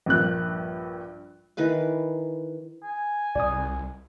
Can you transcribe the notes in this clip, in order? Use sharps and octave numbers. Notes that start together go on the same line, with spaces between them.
A#1 G2 A#3 F#6
D#3 E3 B4 F5
G#5
C2 D5 D#6